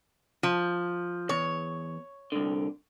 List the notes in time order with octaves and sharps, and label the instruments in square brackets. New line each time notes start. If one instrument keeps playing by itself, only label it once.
[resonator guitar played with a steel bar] F3
[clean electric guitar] E2 [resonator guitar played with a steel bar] C#5
[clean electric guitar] C2 D3